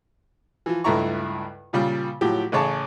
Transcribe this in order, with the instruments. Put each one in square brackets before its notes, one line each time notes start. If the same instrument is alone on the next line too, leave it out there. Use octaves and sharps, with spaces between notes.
[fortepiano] E3 F3
C#2 G2 A3 E4 A#5 C#6
A#2 C#3 G3 F4
A2 F3 F#3 G4
A1 C#3 G#4 C#5 A5